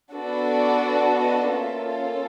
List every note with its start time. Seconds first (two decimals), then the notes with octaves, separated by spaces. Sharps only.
0.13 B3 D4 F#4 A4
0.48 D5
1.18 D#5
1.52 A#3 C#4 F4 A4 E5
1.87 F5